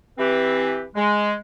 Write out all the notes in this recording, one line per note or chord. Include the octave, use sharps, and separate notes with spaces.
E3 C4 G4 B4
G#3